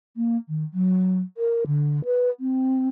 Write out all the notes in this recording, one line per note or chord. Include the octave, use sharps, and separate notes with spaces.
A#3
D#3
F#3
A#4
D3
B4
C4